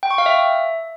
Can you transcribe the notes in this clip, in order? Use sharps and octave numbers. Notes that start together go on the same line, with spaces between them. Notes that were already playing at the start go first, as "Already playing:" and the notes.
G5
C#6
F5
E5